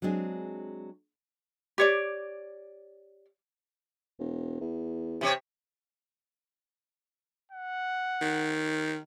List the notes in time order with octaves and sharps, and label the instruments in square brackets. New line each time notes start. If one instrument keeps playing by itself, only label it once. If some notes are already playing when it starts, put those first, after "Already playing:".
[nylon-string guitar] F#3 G#3 C4 D4 G#4
[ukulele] G4 C#5 D5
[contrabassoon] E1
E2
[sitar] C3 G4 C#5
[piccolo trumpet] F#5
[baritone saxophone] D#3